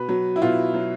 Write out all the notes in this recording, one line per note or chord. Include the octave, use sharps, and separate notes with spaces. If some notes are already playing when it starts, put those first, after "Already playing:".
Already playing: B2 B4
F#3
E4
B2 F4
F#3